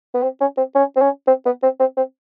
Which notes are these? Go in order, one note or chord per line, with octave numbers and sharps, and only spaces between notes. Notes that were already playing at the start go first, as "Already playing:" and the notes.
B3
C4
C#4
C4
C#4
C4
C#4
C4
B3
C4
C4
C4